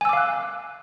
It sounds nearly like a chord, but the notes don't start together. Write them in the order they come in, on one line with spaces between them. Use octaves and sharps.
G#5 E6 D6 F5 F#6